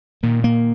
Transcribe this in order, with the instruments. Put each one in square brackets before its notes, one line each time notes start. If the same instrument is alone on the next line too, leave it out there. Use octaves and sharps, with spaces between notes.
[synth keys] A#2 D#3 [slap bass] A#3
[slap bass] A#3